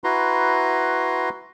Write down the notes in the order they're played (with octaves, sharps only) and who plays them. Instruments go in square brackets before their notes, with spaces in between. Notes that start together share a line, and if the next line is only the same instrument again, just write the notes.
[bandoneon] E4 F#4 B4 A#5 C6